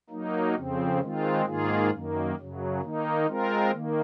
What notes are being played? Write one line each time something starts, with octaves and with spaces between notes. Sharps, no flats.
F#3 A#3 D#4
F2 C#3 F3 C4
D#3 G#3 C4 F4
G#2 D#3 A#3 F4 G#4
F#2 D#3 A#3
F#2 C#3 F#3
D#3 A#3 D#4
G#3 C4 F4 A#4
D#3 A#3